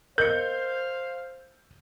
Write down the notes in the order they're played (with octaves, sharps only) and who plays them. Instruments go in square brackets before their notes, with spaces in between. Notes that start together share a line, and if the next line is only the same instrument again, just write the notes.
[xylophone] A#4 D#5 C#7 [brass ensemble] C5 F5 [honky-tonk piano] G6